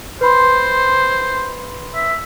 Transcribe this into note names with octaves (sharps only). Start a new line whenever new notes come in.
B4 C5 B5 C6
E5